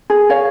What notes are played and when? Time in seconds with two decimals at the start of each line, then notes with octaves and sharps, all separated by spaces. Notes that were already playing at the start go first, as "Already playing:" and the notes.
0.10 G#4
0.30 C#5 F5